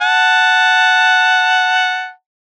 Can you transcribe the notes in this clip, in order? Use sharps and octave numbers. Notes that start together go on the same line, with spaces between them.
F#5 A5